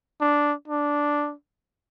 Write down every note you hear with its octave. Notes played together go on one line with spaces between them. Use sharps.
D4
D4